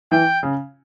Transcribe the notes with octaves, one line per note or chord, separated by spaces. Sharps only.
E3 G5
C#3